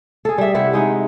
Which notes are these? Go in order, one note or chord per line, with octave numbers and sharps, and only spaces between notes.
G#4 A4
G3 E5
C3 E4 E5 F#5
G#3 D#4 F#5